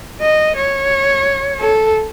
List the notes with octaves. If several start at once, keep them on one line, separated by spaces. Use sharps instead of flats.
D#5
C#5
A4